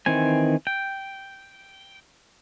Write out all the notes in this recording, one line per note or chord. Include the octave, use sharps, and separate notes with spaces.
D#3 E3 C4 G#5
G5